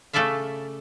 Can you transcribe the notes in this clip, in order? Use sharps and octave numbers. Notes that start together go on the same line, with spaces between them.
C#3 A3 A4 D5 E5 F5